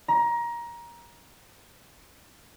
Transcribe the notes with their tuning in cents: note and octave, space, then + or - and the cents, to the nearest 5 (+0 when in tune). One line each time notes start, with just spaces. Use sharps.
A#5 +20